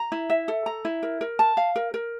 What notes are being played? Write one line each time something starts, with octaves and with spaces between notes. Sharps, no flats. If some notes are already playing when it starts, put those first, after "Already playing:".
Already playing: A#5
E4
E5
A4
A#5
E4
A#4
A#4
A5
F5
A#4
A#4